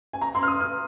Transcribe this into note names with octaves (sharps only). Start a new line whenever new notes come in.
G#5
A#5
C6
F6
D#6
F6